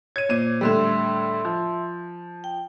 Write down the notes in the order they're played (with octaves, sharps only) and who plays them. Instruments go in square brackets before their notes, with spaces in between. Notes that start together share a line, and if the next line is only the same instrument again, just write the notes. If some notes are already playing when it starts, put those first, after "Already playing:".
[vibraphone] C#5 [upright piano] G#6 D#7
[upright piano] A#2 D#7 [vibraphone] C5
[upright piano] A2 D3 G3 [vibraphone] E5 C6 E6
[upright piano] F3
[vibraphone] G5